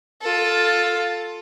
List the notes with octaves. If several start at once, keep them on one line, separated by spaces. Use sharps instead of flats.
F4 A4